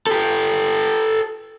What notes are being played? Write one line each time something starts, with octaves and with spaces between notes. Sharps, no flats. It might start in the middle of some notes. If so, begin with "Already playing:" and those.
G4 A4